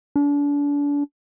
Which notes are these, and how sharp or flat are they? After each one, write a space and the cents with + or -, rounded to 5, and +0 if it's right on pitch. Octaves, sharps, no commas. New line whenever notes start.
D4 -35